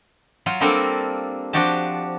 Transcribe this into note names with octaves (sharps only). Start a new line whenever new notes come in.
F#3 F4
G3 A#3 C4 D4 A4 A#4
F3 D4 F#4 G4 A5